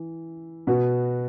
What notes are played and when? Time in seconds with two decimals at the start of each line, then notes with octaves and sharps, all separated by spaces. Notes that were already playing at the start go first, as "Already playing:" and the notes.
Already playing: E3
0.67 B2 B3 F#4